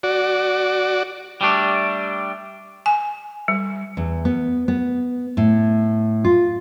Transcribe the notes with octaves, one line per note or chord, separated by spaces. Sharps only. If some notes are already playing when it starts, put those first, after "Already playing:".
F#4 D5
G3 A3 D4
G#5
G3
E2
B3
B3
A2
F4